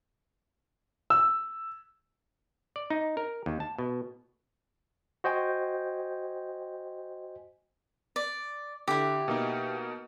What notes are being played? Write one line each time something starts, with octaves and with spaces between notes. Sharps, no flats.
E6
D5
D#4
A#4
D#2
A5
B2
F#4 C5 D#5 G5 G#5
D5
D3 E4 G4
B2 A#3 D#4